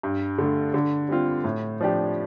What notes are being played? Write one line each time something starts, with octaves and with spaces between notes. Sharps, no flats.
G2
D3 A3
D3
G3 C4 F4
A2
F3 D4 G4